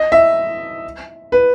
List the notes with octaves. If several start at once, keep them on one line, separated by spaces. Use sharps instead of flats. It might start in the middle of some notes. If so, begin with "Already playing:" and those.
Already playing: D#5
E5
B4